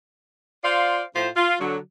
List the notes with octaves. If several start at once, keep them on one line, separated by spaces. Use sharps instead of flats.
F4 C5 D5 F5
A2 F4 C5
F4
D3 F#3